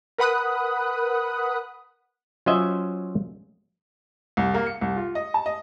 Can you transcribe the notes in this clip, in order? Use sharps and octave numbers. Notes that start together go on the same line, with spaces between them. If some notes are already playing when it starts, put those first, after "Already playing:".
A#4 B4 F#5 B5 D#6 F#6
F#3 C#4 F4 C5 D#5 E5
C2
A#3
C#7
C2
F4
D#5
A5
D#5